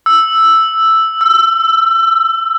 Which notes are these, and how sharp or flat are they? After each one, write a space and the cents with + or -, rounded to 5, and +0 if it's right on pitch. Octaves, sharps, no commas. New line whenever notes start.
E6 +0
E6 +30